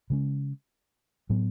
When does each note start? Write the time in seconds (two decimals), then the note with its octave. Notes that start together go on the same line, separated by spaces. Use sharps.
0.10 C#3 G#3 C#4
1.30 A2 F#3 B3